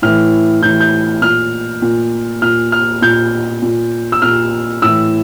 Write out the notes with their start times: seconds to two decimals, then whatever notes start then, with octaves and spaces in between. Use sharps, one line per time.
0.02 A2 E3 F6
0.62 A2 E3 G6
0.81 G6
1.22 A#2 F6
1.82 A#2
2.42 A#2 F6
2.72 F6
3.02 A#2 G6
3.62 A#2
4.12 E6
4.22 A#2 F6
4.82 A2 E3 E6